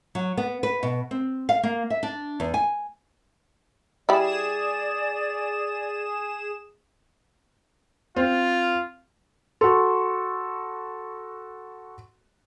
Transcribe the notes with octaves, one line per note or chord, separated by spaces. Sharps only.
F#3
B3
B4
B2
C4
F5
A#3
E5
D4
E2
G#5
G3 E4 G#4 D5 D#6 E7
C4 F4
F#4 A4 C6 C#6